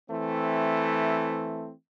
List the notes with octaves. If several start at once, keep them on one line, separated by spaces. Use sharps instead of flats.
E3 A3 C4